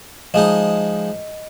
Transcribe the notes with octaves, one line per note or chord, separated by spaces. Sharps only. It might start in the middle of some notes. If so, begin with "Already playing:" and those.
F3 G#3 D#4 D#5